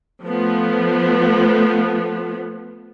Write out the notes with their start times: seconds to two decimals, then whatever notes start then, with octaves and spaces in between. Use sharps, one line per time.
0.23 F3 A3 B3